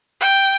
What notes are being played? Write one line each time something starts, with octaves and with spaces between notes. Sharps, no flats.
G5